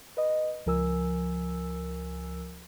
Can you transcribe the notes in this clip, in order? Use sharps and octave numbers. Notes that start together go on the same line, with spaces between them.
B4 D#5
C#2 F3 A#4 G#5 E6